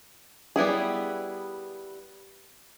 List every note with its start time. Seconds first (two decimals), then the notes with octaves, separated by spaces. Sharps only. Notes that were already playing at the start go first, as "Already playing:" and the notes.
0.56 G3 B3 E4 G#4